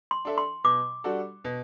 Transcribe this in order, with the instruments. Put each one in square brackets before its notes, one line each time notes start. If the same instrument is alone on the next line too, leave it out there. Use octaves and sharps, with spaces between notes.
[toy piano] C6
[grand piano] D4 A4 E5
[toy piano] C6
[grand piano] B2 [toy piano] D6
[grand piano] G3 D4 F#4 A4
B2